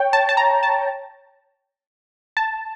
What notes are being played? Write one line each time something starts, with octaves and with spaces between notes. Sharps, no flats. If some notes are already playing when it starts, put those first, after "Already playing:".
Already playing: C#5 G5
A5
A5
A#5
A5
A5